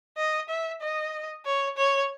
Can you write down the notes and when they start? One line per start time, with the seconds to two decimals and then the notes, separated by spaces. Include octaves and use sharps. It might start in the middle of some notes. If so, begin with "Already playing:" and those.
0.17 D#5
0.49 E5
0.81 D#5
1.45 C#5
1.77 C#5